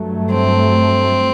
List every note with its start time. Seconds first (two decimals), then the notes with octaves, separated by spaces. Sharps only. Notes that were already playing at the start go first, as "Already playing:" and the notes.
Already playing: G2 F#3 A3
0.31 C4